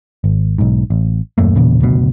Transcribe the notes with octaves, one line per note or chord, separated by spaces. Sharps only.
G#1
B1 G#2
A1
D#1 F#2 A3 A#3
E1 E2 A#2 C#3
F#1 D2 B2